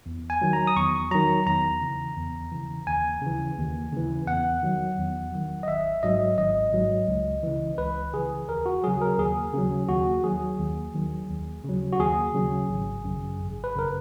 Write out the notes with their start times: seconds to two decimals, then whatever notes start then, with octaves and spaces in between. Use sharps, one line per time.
0.06 E2
0.30 G#5
0.41 D#3 F#3
0.53 A#5
0.67 D#6
0.76 E2 C#6
1.11 D#3 F#3 A#5
1.46 E2 A#5
1.82 C#3 E3
2.17 E2
2.52 C#3 E3
2.87 D#2 G#5
3.22 C#3 E3
3.57 D#2
3.93 C#3 E3
4.27 E2 F#5
4.62 D#3 F#3
4.98 E2
5.32 D#3 F#3
5.63 D#5
5.68 G#1 E5
6.03 G#2 F#3 D#5
6.38 G#1 D#5
6.73 G#2 F#3
7.08 C#2
7.43 C#3 E3
7.78 C#2 B4
8.14 C#3 E3 G#4
8.49 D#2 A#4
8.66 F#4
8.84 C#3 F#3 G#4
9.02 A#4
9.19 D#2 G#4
9.54 C#3 F#3
9.89 D#2 F#4
10.24 D#3 F#3 G#4
10.59 D#2
10.95 D#3 F#3
11.30 D#2
11.64 C#3 F#3
11.93 F#4
12.00 D#2 G#4
12.35 C#3 F#3
12.70 G#1
13.05 F#2 C#3
13.40 G#1
13.64 B4
13.76 F#2 C#3 A#4